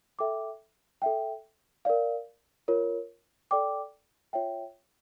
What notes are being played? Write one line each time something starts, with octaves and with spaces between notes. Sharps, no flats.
A4 E5 G5 D6
A4 E5 G5
A#4 D5 F5
F4 A#4 C#5
A4 D5 G5 D6
F4 C#5 E5 G5